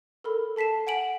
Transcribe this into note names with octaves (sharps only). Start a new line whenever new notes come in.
A4 A#4 B5
A4 A5 B6 C7 E7
F#5 G#5 D7 F#7